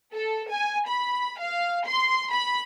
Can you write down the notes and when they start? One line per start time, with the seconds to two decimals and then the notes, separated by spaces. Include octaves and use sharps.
0.14 A4
0.51 G#5
0.88 B5
1.40 F5
1.87 C6
2.33 B5